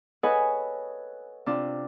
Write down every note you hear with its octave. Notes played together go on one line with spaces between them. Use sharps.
A4 B4 C#5 D#5 F#5 G#5
C3 D4 F4